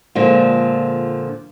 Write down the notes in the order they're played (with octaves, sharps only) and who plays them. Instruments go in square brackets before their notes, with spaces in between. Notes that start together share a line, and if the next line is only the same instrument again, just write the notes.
[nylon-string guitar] A#2 D3 F3 G#3